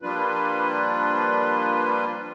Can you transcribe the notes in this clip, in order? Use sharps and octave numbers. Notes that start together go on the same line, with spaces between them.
F3 G3 A#3 D4 F4 B4